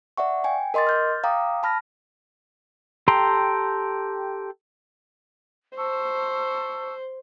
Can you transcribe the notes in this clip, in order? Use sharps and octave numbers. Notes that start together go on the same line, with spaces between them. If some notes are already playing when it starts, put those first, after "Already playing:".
D5 E5 F#5 C#6
G5 G#5
A#4 D#5 C6 D6 A6
F6 G6 A6
F5 G5 A#5 D6 D#6
A5 B5 F6 A#6
G4 A4 G5 A#5 C6
C5 A5 C#6 E6